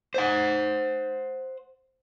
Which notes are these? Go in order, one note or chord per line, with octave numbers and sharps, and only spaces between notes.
C5 F#5